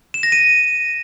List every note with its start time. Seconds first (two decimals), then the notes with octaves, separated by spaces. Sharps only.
0.14 E7
0.23 A#6
0.32 D#7